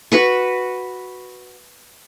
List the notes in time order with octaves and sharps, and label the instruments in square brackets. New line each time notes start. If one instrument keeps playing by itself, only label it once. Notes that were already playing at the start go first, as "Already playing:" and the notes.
[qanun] F#4 B4 C#6